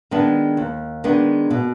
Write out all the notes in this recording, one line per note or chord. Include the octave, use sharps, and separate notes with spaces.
D#3 G#3 B3 D4
D#2
D#3 G#3 B3 D4
B2